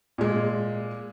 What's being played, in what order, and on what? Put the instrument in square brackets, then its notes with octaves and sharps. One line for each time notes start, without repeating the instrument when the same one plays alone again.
[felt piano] A#2 G#3